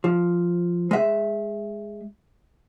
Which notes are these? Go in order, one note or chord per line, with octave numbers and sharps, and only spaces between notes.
F3
G#3 E5